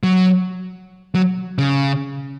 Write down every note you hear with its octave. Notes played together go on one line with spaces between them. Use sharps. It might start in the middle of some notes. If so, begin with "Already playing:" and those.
F#3
F#3
C#3